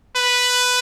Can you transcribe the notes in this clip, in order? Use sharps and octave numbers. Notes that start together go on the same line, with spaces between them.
B4